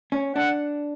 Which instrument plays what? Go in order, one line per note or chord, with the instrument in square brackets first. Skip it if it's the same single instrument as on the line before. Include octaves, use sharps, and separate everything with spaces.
[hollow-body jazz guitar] C#4
[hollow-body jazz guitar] D4 [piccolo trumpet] F#5